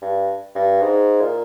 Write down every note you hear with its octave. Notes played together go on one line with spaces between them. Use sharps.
G2
G2
G#2
A#2